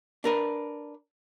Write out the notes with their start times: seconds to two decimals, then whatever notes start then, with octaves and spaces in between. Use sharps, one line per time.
0.24 D4 A#4 B4